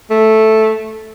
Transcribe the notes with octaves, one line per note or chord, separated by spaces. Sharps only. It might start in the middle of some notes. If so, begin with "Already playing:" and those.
A3